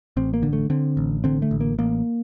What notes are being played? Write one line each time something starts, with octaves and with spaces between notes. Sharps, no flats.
A1 C4
A#3
D3
A3
D3 C4
A1
D3 C4
A3
A1
A#3
A1 A#3